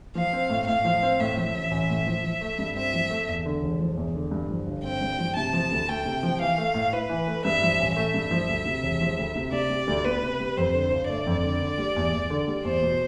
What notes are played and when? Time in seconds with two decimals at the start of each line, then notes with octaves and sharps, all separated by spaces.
0.15 F3 F5
0.33 C4
0.50 A2
0.67 A2 F5
0.85 F3
1.02 C4
1.20 A2 E5
1.37 F3
1.54 A1
1.71 A1
1.90 A2
2.07 F3
2.24 F3
2.41 A3
2.59 G2
2.76 C4 E5
2.94 F3
3.10 A3
3.28 E2
3.46 D3
3.62 E1
3.79 F3
3.97 E2
4.15 D3
4.31 G2
4.50 F3
4.67 G1
4.84 C4 G5
5.01 G2
5.19 F3
5.36 C3 A5
5.53 F3
5.71 D2
5.88 A3 G5
6.05 C3
6.23 F3
6.41 E3 F5
6.58 A3
6.74 A2
6.93 E4 B4
7.10 E3
7.27 A3
7.45 G2 E5
7.62 F3
7.80 A1
7.96 A3 E5
8.14 G2
8.31 F3
8.49 D2
8.66 C3
8.83 E1
9.01 F3
9.18 D2
9.35 C3
9.52 C3 D5
9.69 G3
9.87 D2
10.05 B3 B4
10.22 C3
10.40 G3
10.57 F2 C5
10.74 D3
10.91 G1
11.09 A3 D5
11.26 F2
11.43 D3
11.61 D3
11.78 G3
11.96 E2
12.13 E2
12.30 D3
12.48 G3
12.64 E2 C5
12.82 B2